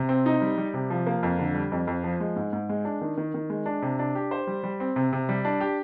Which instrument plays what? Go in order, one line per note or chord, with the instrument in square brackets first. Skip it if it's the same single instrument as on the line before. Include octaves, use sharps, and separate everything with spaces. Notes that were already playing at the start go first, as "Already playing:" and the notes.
Already playing: [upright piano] C3
C4
D#4
G3
G3
C3
F3
A#3
F2
D3
G3
F2
F2
F3
G#3
G#2
G#2
G#3
D4
D#3
D#3
D#3
G#3
D4
C3
D4
G4
C5
G3
G3
C4
C3
C3
G3
D4
G4